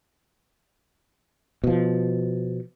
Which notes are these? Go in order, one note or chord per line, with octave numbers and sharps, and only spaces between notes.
B2 F3